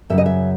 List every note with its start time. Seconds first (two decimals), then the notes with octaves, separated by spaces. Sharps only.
0.10 F#2 C#3 F#3 E5
0.18 D#5
0.26 E5